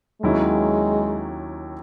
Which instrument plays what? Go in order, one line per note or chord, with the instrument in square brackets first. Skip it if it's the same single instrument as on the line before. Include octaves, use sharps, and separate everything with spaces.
[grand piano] D#2 D#3 F#3 C#4 E4 [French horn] G#3